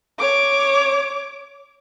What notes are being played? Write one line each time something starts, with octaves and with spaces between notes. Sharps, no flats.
C#5 D6